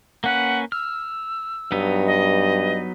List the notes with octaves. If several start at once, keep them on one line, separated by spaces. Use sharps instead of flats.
A#3 C#4 B4 F#5
E6 F6
G2 F#3 B3 D#4
D#5